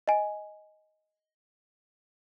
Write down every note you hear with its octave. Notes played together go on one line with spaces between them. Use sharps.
D#5 G#5